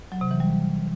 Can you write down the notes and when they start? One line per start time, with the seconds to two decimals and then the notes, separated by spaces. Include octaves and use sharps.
0.12 F#3
0.21 C3
0.31 E3
0.40 G3